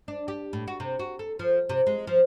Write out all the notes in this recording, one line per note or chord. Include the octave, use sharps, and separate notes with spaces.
D4
G4
A2
F#4
C3
F#4
A4
F3
C3
G#3
F3